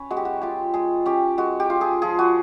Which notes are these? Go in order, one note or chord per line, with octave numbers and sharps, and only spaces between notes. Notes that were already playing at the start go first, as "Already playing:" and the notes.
Already playing: C#4 B4
G#3 F#4
G4
F#4
F4 G4
G#3 G#4
C#4 G4
G#3 F#4
G4
F4
G#4
F3 G#4
F#4